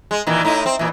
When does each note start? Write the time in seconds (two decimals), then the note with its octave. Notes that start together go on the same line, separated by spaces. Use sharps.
0.11 G#3
0.27 A#2 D#3 E3
0.45 A2 D#4 E4
0.66 C4
0.79 A#2 E3